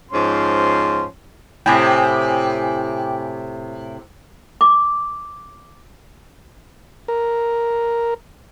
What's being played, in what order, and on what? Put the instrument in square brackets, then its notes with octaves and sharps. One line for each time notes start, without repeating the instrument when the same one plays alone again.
[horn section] G#2 F3 C#4 C6
[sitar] A2 C3 [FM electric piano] G5 G#5 D6
[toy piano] D6
[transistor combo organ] A#4